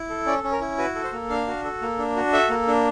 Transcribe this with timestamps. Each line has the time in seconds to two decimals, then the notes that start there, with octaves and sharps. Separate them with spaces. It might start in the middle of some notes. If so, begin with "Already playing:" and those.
Already playing: E4
0.10 A4
0.26 C#4 D5
0.44 C#4
0.52 A#4
0.61 E4
0.78 F#4 B4
0.95 A4
1.04 C5
1.13 A#3
1.30 D4 F5
1.47 F#4
1.64 A4
1.82 A#3
1.99 D4
2.16 F#4
2.33 A4 E5
2.50 A#3
2.68 D4